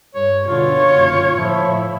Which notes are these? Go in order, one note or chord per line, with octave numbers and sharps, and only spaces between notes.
G2 C#5
B2 D3 F4 C#5
F#1
A2 F3 E4